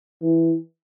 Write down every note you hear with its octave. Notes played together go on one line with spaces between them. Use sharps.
E3